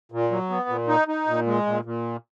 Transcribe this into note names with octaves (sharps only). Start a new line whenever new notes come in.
A#2
F#3
B3
A#2
D#4
D#4
A#2
G#3
A#2
A#2